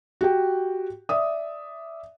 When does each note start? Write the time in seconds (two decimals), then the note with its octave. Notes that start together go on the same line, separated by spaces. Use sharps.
0.21 F#4 G4 G5
1.09 D5 E5 D#6